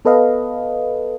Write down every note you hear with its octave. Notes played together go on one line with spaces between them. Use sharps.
B3 A4 B4 D#5 F5